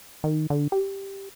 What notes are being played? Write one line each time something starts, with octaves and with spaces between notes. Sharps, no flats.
D#3
D3
G4